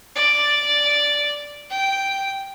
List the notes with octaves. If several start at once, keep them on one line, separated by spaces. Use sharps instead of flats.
D5
G5